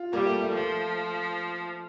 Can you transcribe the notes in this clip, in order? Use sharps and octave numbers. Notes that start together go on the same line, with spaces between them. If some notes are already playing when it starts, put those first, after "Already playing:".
Already playing: F4
G3 A#3
A3
A3
F3 A3